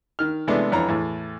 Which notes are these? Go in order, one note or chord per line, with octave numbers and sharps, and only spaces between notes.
D#3 F6
C3 E3 G#3 A3 B3 D4
F2 E3 C#5 A#5
E2 A2